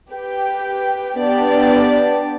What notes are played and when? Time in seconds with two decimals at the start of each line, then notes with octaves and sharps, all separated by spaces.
0.12 G4 B4 G5
1.18 B3 D4 G4 D5